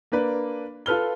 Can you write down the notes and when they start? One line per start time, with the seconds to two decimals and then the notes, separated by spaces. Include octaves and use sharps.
0.12 A#3 D4 B4
0.86 F4 A4 B4 F6 G7